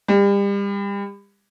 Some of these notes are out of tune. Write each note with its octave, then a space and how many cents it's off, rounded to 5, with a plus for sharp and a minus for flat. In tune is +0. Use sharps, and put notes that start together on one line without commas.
G3 +35